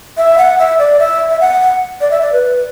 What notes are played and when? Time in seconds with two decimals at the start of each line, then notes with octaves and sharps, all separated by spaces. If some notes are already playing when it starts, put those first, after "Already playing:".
0.18 E5
0.38 F#5
0.59 E5
0.79 D5
0.99 E5
1.29 E5
1.41 F#5
2.01 D5
2.11 E5
2.22 D5
2.33 B4